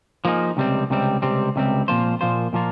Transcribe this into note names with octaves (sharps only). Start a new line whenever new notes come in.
F3 A#3 D#4 G#4
C#2 C3 G3 C4
C#2 C3 G3 C4
C#2 C3 G3 C4
C#2 C3 G3 C4
A#2 F3 A#3 F4 C5
A#2 F3 A#3 F4 C5
A#2 F3 A#3 F4